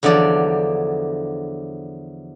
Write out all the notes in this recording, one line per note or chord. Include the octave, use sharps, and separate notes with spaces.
E2 D3 F3 F#3 D5